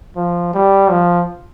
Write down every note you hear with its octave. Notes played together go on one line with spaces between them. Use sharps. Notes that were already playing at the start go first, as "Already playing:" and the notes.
F3
G3
F3